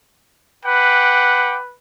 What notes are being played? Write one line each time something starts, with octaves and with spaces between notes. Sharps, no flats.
B4 F#5 G5 D6